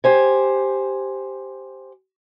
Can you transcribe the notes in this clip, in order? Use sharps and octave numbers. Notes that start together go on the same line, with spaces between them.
G4 C5 G#5